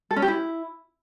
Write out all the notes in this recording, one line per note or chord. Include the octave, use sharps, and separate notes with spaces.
A4
C#4
G4
E4